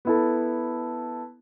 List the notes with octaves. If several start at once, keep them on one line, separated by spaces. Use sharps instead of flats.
B3 E4 A4